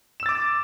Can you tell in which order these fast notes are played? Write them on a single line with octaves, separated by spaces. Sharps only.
E7 E6 A6 D6